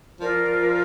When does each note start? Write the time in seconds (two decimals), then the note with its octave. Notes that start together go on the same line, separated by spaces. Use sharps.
0.20 F3 F4 A#4 D5
0.48 F3